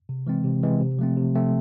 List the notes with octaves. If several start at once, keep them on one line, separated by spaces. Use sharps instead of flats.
C3
E3 G#3 C4
C3
E3 G#3 C4
C3
F3 A3 C4
C3
F3 A3 C4